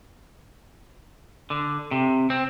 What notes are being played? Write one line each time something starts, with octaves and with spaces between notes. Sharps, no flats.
D3
C3
C4